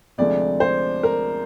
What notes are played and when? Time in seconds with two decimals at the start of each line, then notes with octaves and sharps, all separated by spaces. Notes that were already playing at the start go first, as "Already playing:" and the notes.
0.18 D2 C3 F3 G#3 D5
0.60 C5
1.03 A#4